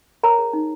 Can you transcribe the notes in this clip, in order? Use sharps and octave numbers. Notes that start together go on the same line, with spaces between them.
A#4 C#5 A#5
G#4
D#4